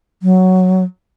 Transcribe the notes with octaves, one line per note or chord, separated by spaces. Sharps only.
F#3